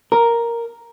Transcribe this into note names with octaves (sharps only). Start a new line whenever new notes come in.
A#4